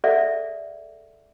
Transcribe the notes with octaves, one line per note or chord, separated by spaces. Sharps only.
G#4 A4 D5 E5 F#5